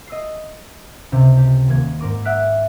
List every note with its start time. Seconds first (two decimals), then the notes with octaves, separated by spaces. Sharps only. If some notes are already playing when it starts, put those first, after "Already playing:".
0.07 D#5 E6 C7
1.12 C#2 C3 G6
1.37 G4
1.68 D#1 A#3 G#6
1.99 G#2 A#4 D6 D#7
2.25 E5 F#5 F6 F#6 B6 D7